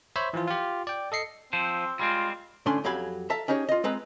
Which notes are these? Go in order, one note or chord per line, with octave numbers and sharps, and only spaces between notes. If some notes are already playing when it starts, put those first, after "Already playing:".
C5 C#5 E5 B5
E3 F3 F4
F4 G4
D5 G5
A4 D#5 C7 C#7
F3 C4 C5
G3 G#3 C4 F4
A2 D3 C#4 D4 G#5 C6
F2 F#3 G4 F5 G#5 B5
A4 E5 F5 A5 A#5
C#4 D#4 G4 G#4 C#5
F4 D#5
G#3 C4 B4 A#5